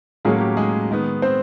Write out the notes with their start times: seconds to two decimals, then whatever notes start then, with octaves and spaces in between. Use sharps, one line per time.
0.25 A2 F#3 G#3 A#3 C#4 G#4
0.41 G4
0.57 G#3 G#4
0.90 D#3 G#3 B3
1.22 C4 C5